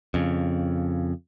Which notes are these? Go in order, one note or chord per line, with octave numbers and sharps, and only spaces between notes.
F2 C#3